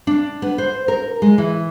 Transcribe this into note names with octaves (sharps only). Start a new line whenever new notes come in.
D4
B3
C5
A#4
G#3
E3